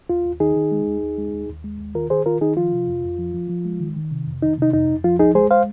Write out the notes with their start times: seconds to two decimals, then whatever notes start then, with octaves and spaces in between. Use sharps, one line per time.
0.10 D#2 F4
0.25 D#2
0.40 D#3 D#4 G#4
0.56 D#3
0.72 G#3
0.87 D#2
1.02 D#2
1.18 G#3
1.33 D#2
1.49 D#2
1.64 G#3
1.80 D#2
1.95 D#3 F4 A#4
2.10 D#3 G#4 C5
2.26 D#3 F4 A#4
2.41 D#3 D#4 G#4
2.57 F3 F4
2.72 C3
2.88 F2
3.04 F2
3.19 F3
3.34 F3
3.50 F3
3.65 G#3
3.80 D#3
3.96 D#3
4.11 C3
4.27 F2
4.42 D#3 D#4
4.58 C3 D#4
4.73 F2 D#4
4.89 F2
5.04 F3 F4
5.19 C2 D#4 G#4
5.35 G#3 G#4 C5
5.51 C5 F5